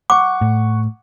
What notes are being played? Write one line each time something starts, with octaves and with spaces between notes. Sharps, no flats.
F#5 C#6 D6
A2